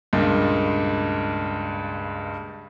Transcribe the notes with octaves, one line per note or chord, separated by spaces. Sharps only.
C#2 G2 A#2